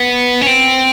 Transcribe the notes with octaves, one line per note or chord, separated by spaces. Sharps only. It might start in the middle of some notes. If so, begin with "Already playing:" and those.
Already playing: B3
C#4
C4